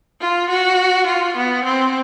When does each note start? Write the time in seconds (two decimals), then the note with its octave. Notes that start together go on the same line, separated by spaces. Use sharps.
0.21 F4
0.50 F#4
1.07 F4
1.37 B3
1.65 C4